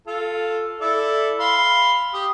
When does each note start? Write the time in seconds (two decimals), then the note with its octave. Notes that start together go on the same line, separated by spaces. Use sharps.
0.07 F4 A4
0.81 E4 A4 D5
1.40 F5 B5 C6
2.14 G4 D#6